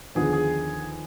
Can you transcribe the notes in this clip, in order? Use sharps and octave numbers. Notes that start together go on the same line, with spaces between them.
D#2 D3 F3 B3 G#4
G#4